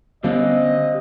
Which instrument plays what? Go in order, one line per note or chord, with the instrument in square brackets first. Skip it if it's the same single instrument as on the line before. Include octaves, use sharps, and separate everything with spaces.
[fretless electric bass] D3 B3 C#4 [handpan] G3 [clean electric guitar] G4 C5 F5 [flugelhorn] D#5